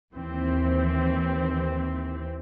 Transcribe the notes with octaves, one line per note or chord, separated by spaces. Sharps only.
D#2 E3 C4